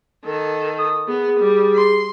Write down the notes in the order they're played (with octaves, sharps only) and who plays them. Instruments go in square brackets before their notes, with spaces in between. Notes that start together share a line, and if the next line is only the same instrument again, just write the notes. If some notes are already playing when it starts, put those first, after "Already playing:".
[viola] D#3 A4
[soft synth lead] D#6
[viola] B3 [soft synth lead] G#4
[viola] G3
C6